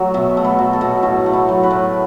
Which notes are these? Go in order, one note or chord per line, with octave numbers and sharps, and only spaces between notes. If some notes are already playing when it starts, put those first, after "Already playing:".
Already playing: F#3 A3
B2 E5
A3
B4
F#3
A4
B2
A2 F#4
A3
E4
F#3
B4
A2